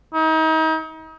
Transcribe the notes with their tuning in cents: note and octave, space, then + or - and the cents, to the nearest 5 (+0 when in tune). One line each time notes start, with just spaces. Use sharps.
D#4 +35